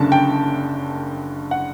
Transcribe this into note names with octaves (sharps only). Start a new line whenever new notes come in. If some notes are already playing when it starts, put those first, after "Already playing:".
Already playing: F#1 F#2 D3 A5
G5
F#5